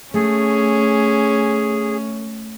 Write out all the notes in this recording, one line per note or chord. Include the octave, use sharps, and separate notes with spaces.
A3 C#4 G#4